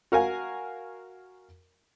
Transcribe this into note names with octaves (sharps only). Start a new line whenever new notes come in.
F#4 A#4 F5 G#5